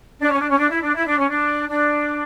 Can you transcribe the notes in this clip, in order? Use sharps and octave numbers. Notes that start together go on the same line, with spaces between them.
D4
C#4
D4
C#4
D4
E4
D4
E4
D4
C#4
D4
D4